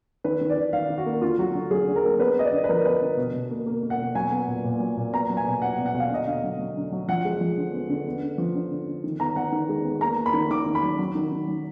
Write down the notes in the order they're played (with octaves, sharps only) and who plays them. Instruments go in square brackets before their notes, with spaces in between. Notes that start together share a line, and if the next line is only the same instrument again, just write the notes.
[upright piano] D#3 B4
D#3
D5
D#3
D#3 F5
D#3
F#4
A#3
D3 F4
F#3 F#4
D3
F#3 G#4
D3
A#4
A#3
B3 B4
B3 D#5
D5
D3
B4
F3 A#4
B3 B4
D3
B2
B2
A#3
A#3
A#3
F#5
B2
F#3 G#5
B3
A#2
A#2
F#3
A#2
B3 A#5
F#3
G#5
B2
B3 F#5
B2
F#5
B2
F5
D3 D#5
D3 F5
F#3
F#3
D3
F#3
F3 F#5
G#3
F3
D3
B3
D3
B3
D3
F3
D3
D3
D3
D#3
B3 A#5
B3 F#5
D#3
G#3
B3
A#3 A#5
A#3
B5
D#3
D#3 D6
D#3
B5
F#3
F#3
D#3
D#3
F#3